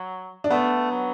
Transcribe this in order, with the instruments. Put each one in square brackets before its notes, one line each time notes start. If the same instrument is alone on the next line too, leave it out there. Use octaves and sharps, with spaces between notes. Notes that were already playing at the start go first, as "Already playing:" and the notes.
Already playing: [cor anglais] F#3
[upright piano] D4
[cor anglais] A3 [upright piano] B3
[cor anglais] F#3